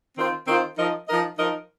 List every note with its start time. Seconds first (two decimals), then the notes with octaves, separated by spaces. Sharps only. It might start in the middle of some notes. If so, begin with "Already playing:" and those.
0.16 D#3 C4 F4 C5
0.46 D#3 C4 F4 C5
0.77 F3 D#4 A#4 D#5
1.07 F3 D#4 A#4 D#5
1.38 F3 D#4 A#4 D#5